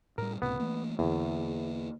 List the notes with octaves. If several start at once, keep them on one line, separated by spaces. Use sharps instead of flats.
A2 G3 A#4
C#2 A2 C3 B3
E3 A3 A#3
E2 D3 A#3